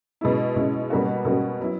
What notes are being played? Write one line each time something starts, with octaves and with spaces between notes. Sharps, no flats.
B2 G#3 C#4 E4
B2 G#3 C#4 E4
B2 G3 A#3 C#4 F#4
B2 G3 A#3 C#4 F#4
F#3 B3 E4